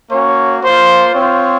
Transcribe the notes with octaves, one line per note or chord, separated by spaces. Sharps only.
A#3 C#4 F#4 C#5
A#3 F4 C5
C4 F4 C#5